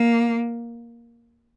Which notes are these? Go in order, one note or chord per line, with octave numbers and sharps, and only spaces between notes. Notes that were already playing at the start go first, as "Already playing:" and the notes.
Already playing: A#3